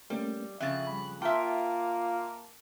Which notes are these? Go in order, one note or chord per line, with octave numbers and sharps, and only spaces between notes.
G3 A3 A#3 C#4
F2 C#3 E5 F#6 A6
G3 B5
A#3 F4 E5 G5 A5